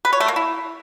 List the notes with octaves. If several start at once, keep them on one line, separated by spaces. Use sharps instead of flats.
B4
C#5
A3
A#3
E4